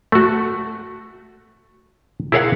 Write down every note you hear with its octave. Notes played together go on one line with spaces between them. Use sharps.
A3 F#4
E4 G#4 A#4 C#5 F5 F#5